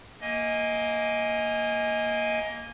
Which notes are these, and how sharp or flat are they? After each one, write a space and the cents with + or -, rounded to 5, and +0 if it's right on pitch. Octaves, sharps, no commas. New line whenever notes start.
A#3 +0 D#5 +20 G#5 +0